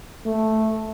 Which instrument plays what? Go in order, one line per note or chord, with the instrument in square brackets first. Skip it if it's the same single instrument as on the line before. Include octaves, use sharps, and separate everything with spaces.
[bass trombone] A3